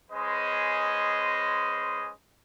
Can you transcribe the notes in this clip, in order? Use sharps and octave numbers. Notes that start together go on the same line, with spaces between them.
G#3 C#4 B4 C5 D#5 C6